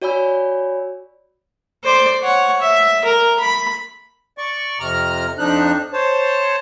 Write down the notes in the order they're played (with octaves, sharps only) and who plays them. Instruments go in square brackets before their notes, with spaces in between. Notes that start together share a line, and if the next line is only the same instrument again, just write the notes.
[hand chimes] F#4 C#5 D5 G#5 B5 E6
[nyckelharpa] C5 D5
C#5 F#5
E5
A#4
B5
[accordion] D5 C#6
F2 C3 A#5 F6
F2 F3 D4 D#4 F#6
C5 C#5 A5